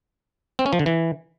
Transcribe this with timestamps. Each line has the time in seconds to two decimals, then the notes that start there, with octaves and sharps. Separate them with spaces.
0.59 C4
0.66 C#4
0.73 F3
0.79 D3
0.86 E3